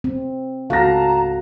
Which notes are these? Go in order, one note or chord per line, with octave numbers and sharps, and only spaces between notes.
C4
C#2 G#2 F#4 A4 F5 A5 A#5 A#6